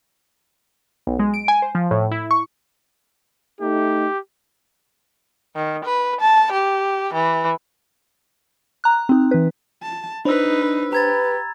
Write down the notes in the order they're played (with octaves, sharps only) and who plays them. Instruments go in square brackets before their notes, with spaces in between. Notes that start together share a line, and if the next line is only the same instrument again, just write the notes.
[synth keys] B1
G#3
D7
G#5
C5
F3
A2
E4
C#6
[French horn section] A3 D#4 [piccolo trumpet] G4
[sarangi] D#3
B4
A5
G4
E3
[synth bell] A#5 F#6
C4 D#4
E3 B4
[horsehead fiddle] A5
[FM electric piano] D4 C5 [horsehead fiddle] D#4 B4 [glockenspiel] B5 E6
[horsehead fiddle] G4 [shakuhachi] B4 [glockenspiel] A#5 G#6 A6